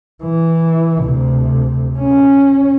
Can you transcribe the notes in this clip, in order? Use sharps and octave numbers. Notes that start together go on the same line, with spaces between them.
E3
D2 C3
C#4